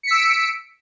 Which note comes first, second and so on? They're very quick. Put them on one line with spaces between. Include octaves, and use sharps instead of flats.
C#7 B6 E6 D7